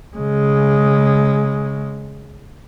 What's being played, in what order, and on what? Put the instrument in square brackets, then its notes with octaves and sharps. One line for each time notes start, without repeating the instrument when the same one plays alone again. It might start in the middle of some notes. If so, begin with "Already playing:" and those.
[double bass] C#3 G#3